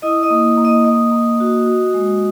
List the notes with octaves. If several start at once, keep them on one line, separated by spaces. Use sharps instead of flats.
E4 D#5 D#6
D#5 D#6
A#3
A#3
D#5 D#6
A#3 D#5 D#6
A#3
F#4
F#4
G#3